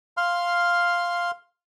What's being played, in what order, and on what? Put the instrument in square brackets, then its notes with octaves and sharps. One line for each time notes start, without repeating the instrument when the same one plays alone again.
[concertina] F5 C6 F6